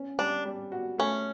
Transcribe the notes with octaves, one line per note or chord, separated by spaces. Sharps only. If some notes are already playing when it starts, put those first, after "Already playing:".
Already playing: C#4
G3 D4
G3
F#4
A3 C#4